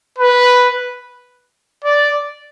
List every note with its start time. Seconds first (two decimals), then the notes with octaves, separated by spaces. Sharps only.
0.18 B4
1.84 D5